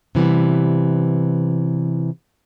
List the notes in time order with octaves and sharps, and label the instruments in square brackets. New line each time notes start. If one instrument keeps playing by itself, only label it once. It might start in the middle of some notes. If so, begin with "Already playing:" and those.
[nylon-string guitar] C3 E3 G3 B3